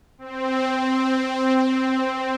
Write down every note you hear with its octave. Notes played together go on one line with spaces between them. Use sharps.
C4
C4